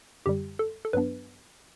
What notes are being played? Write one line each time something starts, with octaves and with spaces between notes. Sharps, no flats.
F#2 D3 G3 G4
A4
A4
G2 F#3 B3 D4 B4